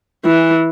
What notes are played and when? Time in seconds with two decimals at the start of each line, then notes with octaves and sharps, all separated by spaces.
0.25 E3